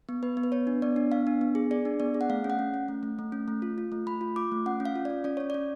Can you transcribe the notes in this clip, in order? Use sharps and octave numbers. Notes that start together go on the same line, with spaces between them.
B3
B3 B4
B3
B4
B3 C#5
D4
B3 D5
D4
B3 F5
D4
B3
G#4
G#4 D5
D4
B3 D5
G#4
F#5
A3 F5
C#4
F#5
C#4
C#4
A3
A3
A3
C#4
A3
F4
F4
A3
A3 B5
F4
F4 D6
A3
C#4 F#5
C#4
F5
F4
D5
C#4
C#4 D5
C#4 C#5
C#4 D5